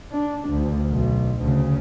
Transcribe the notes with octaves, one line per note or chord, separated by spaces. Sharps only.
D4
D2
B1
D2 C#3